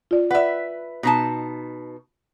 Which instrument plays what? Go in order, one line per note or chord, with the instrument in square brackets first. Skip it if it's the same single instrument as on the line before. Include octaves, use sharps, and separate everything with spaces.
[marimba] F4 D5
[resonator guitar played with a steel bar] B4 E5 [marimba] D5 F#5
[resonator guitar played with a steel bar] B2 D#4 A5